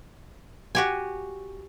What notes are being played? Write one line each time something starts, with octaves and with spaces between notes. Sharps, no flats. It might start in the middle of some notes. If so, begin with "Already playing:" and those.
F#4 G4 G#5